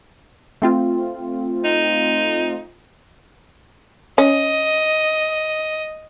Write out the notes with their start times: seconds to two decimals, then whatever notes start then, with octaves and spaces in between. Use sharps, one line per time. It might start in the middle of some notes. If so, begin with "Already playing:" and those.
0.62 A3 C4 F4
1.65 D#4
4.18 C#4 D#5